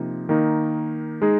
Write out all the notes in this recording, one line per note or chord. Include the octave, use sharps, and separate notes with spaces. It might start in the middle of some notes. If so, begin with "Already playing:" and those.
Already playing: C3 F3 A#3 D#4
D#3 A#3 D#4
G#3 D#4 G#4